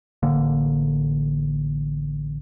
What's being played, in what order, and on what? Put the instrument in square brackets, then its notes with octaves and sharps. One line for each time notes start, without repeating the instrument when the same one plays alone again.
[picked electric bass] A1 D3 A#3